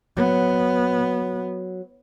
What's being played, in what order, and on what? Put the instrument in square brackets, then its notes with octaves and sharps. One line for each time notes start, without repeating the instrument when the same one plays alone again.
[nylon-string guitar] F#3 [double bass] B3